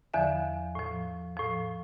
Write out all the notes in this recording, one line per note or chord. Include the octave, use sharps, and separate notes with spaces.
E2 D3 F3 E5
A2 F3
A2 F3